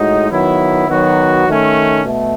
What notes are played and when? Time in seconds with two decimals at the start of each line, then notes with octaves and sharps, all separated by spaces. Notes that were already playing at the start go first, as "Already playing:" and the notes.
Already playing: A2 G#3 D#4 F#4
0.30 D#3 F#3 B3 E4
0.89 D#3 F#3 B3 F#4
1.46 D#3 A3 C#4
2.05 B2 A3